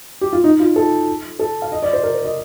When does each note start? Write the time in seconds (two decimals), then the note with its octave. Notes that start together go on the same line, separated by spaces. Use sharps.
0.21 G4
0.33 F4
0.44 D#4
0.60 F4
0.76 A4
1.39 A4
1.62 F5
1.72 D#5
1.83 D5
1.93 C5
2.03 A#4
2.14 C5
2.25 D#5